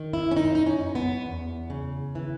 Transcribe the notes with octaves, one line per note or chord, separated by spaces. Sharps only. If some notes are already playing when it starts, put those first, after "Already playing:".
Already playing: D#3
E4
C#4
F#2 D#4
D#4
C#4
F#2
B3
E2
C#3
E3